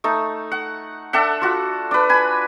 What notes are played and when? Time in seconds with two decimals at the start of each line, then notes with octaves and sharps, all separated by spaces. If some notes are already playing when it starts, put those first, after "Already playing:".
0.04 A3 D#4
0.52 F#5
1.13 D4 A4 E5 F#5
1.42 F4 F#4
1.91 D4 B4
2.09 G#5 B5